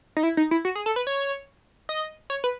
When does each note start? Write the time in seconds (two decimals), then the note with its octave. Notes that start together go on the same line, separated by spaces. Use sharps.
0.17 D#4
0.23 E4
0.37 D#4
0.51 E4
0.65 F#4
0.75 G#4
0.86 A4
0.96 B4
1.07 C#5
1.89 D#5
2.30 C#5
2.44 B4